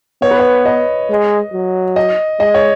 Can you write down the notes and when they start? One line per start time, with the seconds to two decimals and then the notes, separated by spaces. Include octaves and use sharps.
0.22 B3 C#5
0.31 B4
0.40 C#5
0.65 D#5
1.09 G#3
1.53 F#3
1.96 D#5
2.40 G#3 D#5
2.54 C#5